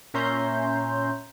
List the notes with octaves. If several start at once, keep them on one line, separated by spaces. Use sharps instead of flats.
A#2 C#4 E5 A#5 C6 G6